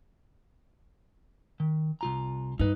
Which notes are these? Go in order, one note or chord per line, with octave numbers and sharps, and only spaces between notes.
D#3
C2 F4 A#5
G2 D#4 B4